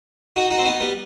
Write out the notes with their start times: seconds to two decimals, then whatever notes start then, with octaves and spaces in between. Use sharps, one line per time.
0.36 D#4 F#4
0.50 D#4 F#4
0.58 C4
0.65 B3 D#4
0.80 G3 B3